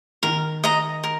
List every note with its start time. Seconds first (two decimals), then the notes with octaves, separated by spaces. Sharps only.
0.23 D#3 A#4
0.64 D#5 A#5
1.04 A#4